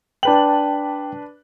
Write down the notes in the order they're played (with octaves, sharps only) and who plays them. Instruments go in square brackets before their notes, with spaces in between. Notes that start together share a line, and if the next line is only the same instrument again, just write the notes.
[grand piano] D4 B4 F#7 [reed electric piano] G5 A5